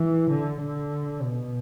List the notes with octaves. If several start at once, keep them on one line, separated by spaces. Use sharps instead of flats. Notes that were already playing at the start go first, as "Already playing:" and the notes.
Already playing: E3
D3
D3
B2